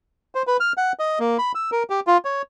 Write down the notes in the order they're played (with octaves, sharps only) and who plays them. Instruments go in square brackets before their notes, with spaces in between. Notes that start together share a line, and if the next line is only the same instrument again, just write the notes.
[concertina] C5
B4
F6
F#5
D#5
A#3
B5
E6
A#4
G4
F4
C#5